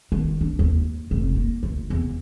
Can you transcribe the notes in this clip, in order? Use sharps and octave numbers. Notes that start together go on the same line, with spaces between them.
D#3
D4
D#2
F1
A#3
D2
E2